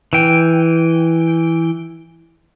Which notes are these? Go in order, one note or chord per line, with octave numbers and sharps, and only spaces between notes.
E3 G5